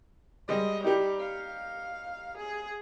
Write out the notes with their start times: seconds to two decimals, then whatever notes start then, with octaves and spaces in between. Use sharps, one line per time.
0.49 G3 G#3 D#5
0.84 G3 D#4 G4
1.20 F5
2.38 G#4